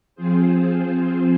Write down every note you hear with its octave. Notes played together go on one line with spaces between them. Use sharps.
F3 C4 F4 G#4 C5